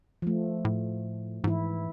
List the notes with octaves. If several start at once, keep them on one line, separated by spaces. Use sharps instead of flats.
F3 A3
A2
G#2 E3 E4